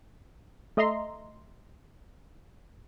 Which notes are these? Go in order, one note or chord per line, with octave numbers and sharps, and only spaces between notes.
A3 D#5 E5 A#5 C6